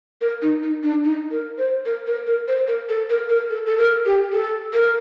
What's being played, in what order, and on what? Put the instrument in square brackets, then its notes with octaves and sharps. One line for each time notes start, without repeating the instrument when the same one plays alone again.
[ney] A#4
D#4
D#4
D4
D#4
A#4
C5
A#4
A#4
A#4
C5
A#4
A4
A#4
A#4
A4
A4
A#4
G4
A4
A#4